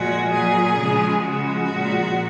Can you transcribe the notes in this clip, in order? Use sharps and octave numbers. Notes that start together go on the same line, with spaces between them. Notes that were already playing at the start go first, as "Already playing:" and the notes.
Already playing: A#2 F3 G#3 F#4
A#2 F#3 G#4
C#3 F3 G#3
C#3 F3 G#3 F#4
A#2 F3 G#3